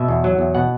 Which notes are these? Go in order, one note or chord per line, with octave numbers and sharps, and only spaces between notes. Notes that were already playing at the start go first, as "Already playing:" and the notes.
Already playing: B2 E5
E2
F#3
E2
B2 F#5